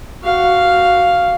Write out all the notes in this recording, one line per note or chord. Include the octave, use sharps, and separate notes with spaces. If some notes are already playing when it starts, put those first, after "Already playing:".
F#4 F5